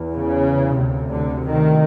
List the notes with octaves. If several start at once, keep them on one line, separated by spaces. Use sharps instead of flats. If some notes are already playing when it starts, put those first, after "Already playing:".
Already playing: E2
C#3
D2 C3
D3
D#3